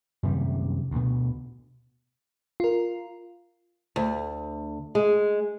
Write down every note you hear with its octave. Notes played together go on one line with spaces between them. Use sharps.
F#2 C3 D#3 G3
D2 B2
F4 A#4
D2
G#3